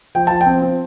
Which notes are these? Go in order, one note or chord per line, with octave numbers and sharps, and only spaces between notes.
F3 G5
F3 A5
G5
C4
C4